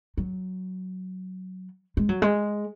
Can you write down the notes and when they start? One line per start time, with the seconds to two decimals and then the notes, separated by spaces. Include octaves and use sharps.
0.17 F#3
1.97 G#3
2.09 F#3
2.22 G#3